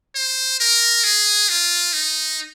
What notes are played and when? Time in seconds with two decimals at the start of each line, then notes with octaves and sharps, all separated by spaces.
0.15 C5
0.60 A#4
1.04 G#4
1.49 F4
1.93 D#4